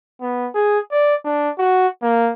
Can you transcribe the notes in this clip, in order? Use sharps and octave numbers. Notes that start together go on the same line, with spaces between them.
B3
G#4
D5
D4
F#4
A#3